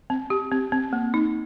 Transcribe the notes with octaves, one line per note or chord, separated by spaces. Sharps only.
C4
G4
C4
C4
A#3
D#4